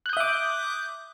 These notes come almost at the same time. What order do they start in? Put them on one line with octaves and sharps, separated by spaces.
F#6 G6 D#6 E5 D6